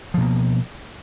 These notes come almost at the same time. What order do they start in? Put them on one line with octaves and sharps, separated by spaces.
F3 B2 A#3